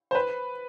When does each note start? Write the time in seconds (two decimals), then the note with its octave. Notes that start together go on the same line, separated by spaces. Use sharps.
0.11 C5
0.15 B4